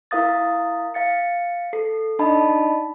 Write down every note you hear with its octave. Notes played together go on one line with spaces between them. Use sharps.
E4 A#4 F5 D#6 A6
F5 A6 C#7
A4 C7
D4 D#4 D5 D#5 A5 B5